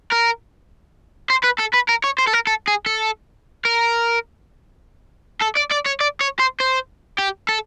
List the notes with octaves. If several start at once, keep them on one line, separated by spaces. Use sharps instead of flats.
A#4
C5
B4
A4
B4
A#4
C#5
C5
A4
A#4
A4
G#4
A4
A#4
A4
D5
D5
C#5
D5
C#5
C5
C5
G4
A4